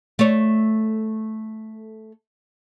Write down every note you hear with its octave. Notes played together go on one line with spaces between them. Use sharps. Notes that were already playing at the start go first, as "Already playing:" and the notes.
A3 C#5